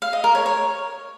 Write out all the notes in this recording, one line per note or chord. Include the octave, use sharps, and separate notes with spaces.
F5
D#5
A#4
C#5
C#5